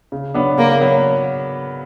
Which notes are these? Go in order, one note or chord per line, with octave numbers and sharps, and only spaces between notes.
C#3
F#3 B3 D4
C#3 A#3
F#3 B3